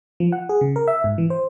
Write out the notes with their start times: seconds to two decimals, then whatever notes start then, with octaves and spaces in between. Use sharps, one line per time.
0.20 F3
0.32 F#5
0.49 G#4
0.61 C#3
0.76 A#4
0.88 E5
1.04 G#2
1.18 E3
1.30 C5